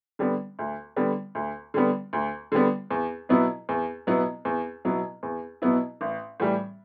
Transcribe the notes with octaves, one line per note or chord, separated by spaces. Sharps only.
D3 G3 B3
D2
D3 G3 B3
D2
D3 G3 B3
D2
D3 G3 B3
E2
B2 F#3 B3 E4
E2
B2 F#3 B3 E4
E2
B2 F#3 B3 E4
E2
B2 F#3 B3 E4
A1
A2 E3 G3